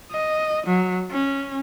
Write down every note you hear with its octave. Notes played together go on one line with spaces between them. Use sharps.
D#5
F#3
C#4